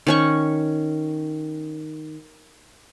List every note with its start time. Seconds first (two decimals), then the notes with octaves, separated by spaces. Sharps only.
0.07 D#3 C#4 C#6